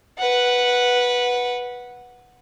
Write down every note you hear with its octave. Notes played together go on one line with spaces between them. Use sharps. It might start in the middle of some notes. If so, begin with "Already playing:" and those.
B4 F#5